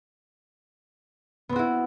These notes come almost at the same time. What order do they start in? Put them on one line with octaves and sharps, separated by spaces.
B3 C4 F#4 E4